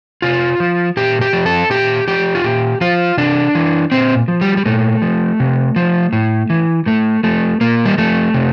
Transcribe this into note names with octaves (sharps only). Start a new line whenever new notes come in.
C3 F4
F3
A#2 G4
G4
F3
A4
A#2 G4
F3 G4
F4
A#2 G4
F3 F4
C3 D4
E3
A#2 C4
F3
G3
G3
A#2 A3
F3
C3
F3
A2
E3
A2 A3
F3 A3
A#2 A#3
G3
F3 A3
C3